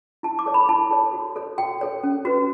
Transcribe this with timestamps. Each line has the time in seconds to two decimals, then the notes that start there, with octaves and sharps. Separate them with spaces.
0.23 E4 A5
0.39 D6
0.46 A4 C#5
0.54 B5
0.69 E4 A5
0.91 A4 C#5
1.13 F#4
1.36 A4 C#5
1.58 F#4 G5
1.81 A4 C#5
2.04 C#4
2.25 F#4 B4